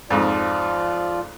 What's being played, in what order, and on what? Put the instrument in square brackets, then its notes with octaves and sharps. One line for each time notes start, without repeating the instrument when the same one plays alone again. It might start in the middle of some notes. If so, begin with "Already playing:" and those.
[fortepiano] F2 G#2 [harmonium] F3 F4 D5